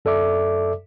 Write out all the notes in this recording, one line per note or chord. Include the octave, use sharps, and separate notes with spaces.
F#2 A4 D5 E5 D6